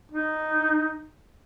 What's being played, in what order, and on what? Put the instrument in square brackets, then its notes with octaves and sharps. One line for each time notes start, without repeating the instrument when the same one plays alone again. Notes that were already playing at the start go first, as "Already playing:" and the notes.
[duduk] D#4